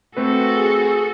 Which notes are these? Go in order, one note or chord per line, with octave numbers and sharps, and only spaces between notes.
A3 C4 F#4 A4 B4
G#4